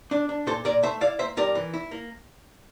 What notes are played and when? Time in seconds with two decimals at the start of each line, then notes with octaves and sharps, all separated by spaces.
0.11 D4
0.29 D4
0.47 A#2 A4 C5
0.65 A#2 A#4 D5
0.83 A3 C5 E5
1.01 E4 D5 F5
1.19 A#3 C5 E5
1.37 G2 A#4 D5
1.55 E3
1.74 E4
1.91 A#3